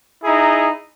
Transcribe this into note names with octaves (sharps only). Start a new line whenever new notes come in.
D#4 E4 G#4 A#5